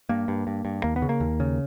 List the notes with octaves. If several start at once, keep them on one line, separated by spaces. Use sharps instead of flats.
G2 A#3
G2
G2
G2
D#2 A#3
B3
C#3
A#3
D#2
C#3